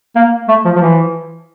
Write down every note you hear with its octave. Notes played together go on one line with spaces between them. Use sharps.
A#3
A3
F3
F3
E3